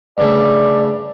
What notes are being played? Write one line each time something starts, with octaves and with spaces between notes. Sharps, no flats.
G2 C#3 A3 D5